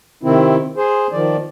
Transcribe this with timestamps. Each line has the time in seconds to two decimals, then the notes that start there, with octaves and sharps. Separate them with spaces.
0.23 C3 D#3 C4 E4
0.77 G#4 C5
1.12 D#3 F3 D5